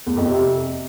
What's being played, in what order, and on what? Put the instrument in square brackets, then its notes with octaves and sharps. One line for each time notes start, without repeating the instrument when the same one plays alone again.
[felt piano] E2
F2
C3